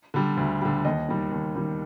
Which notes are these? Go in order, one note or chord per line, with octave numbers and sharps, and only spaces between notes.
D3 G3
D2
D3 G3
D#2 D#5
D#3 G3
D#2
D#3 G3